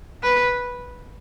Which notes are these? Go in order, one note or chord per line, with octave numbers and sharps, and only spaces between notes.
B4